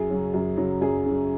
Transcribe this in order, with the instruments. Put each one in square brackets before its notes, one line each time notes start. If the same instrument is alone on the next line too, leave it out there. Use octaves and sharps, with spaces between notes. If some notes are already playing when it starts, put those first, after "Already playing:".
Already playing: [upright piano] F#2 G#4
C#3 F#3
F#2
C#3 F#3
F#2 G#4
C#3 F#3